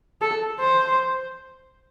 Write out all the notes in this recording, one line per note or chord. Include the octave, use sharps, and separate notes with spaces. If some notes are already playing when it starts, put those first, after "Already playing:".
A4
C5